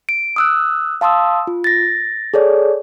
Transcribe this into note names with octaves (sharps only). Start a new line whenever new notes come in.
D7
D#6 E6 F#6
F5 A5 C6 D#6 E6
F4
A6 A#6
G#4 A4 C#5 D5